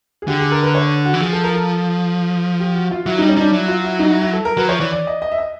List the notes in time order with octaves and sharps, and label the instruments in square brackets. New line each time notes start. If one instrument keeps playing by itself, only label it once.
[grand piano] G#4
[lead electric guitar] D3 [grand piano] G4
[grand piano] G#4
A#4
B4
C#5
F#4
[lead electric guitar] E3
[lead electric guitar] F3 [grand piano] G#4
[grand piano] A4
A#4
A4
G4
F#4
F4
[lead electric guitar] F#3 [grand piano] E4
[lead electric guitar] G3 [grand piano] D#4
[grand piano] C#4
[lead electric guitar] G3 [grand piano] D#4
[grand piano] D4
[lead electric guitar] F#3 [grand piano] E4
[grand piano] F4
E4
D#4
E4
E4
A4
A#4
[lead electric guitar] F#3 [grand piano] B4
[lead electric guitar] F3 [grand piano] C#5
[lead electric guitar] E3 [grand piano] D5
[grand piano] D5
D#5
D#5
E5
D#5